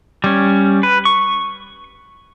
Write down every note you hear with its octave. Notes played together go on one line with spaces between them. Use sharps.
G3 C#4
B4
C#6